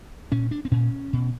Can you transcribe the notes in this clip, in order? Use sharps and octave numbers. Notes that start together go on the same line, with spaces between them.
A#2 C#4
D4
C4
A#2 C#4
B2